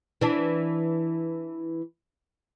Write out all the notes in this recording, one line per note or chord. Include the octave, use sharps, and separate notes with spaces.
E3 D4